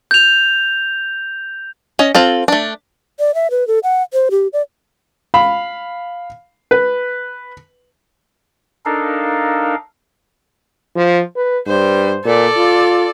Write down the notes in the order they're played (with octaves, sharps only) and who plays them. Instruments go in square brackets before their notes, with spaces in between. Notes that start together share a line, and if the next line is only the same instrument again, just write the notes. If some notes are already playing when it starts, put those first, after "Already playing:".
[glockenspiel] G6 F7
[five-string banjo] C#4 D#5
C4 F4 A4
A3 D4
[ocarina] D5
E5
B4
A4
F#5
C5
G4
D5
[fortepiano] F5 B5
B4
[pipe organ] D4 D#4 A4 A#4 F5
[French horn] F3
B4
[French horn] G2 [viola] C5
[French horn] A#2 [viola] A4 D5
[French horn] F4